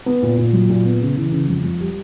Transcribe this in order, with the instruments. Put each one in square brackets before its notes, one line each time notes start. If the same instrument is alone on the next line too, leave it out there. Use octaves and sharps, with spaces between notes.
[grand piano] B3
A#2
A#2
F#3
A#2
B3
C#3
E3
C#3
F2
F2
G3